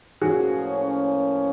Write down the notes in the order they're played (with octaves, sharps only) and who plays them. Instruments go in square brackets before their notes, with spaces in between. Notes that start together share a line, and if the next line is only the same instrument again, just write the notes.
[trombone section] A2 F3 A#3 C#4 [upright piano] F#4 G#4